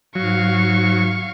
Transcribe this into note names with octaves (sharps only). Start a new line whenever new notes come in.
G#2 F#3 F5 C#6